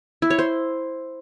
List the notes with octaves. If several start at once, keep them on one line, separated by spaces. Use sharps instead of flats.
E4
C#5
C5